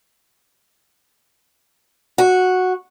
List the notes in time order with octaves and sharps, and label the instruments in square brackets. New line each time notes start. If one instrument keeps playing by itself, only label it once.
[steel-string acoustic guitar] F#4